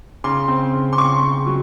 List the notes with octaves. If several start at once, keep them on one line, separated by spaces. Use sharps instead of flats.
C#3 C6
C4
C#3
C6
C#3 C#6
C#3
F#3